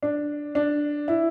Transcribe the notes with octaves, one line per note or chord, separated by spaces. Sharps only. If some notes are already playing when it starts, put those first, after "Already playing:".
D4
D4
E4